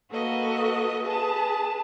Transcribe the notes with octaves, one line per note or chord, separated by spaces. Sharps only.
A#3 F#4 A4 B4 D#5
G#4 B4 A5